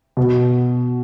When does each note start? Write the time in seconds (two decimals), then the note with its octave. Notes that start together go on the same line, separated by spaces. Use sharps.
0.17 B2